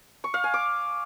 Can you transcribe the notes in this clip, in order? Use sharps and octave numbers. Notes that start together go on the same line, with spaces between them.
C#6
F5
G#5
D6